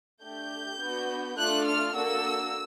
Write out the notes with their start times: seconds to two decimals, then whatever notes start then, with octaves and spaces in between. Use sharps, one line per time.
0.22 A3 D4 G4 G6
0.80 B3 D4 F#4
1.37 A3 D4 F4 A4 F#6
1.66 F6
1.94 A#3 D4 F#4 A4 E6